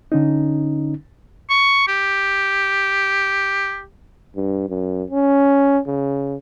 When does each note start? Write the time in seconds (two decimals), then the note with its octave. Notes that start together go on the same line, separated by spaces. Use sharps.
0.12 D3 C#4 D#4
1.50 C#6
1.88 G4
4.36 G2
4.69 F#2
5.11 C#4
5.87 C#3